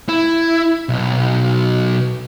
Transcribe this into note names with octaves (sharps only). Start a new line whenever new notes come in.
E4
B1